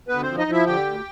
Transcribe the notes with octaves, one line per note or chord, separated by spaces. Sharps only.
D2 B3 B4
F3 C4 C5
D#4 D#5
F3 E4 E5
D3 G4 G5
D2